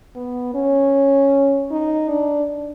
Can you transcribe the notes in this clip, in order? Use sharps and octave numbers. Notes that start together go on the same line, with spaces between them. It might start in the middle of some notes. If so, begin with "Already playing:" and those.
B3
C#4
D#4
D4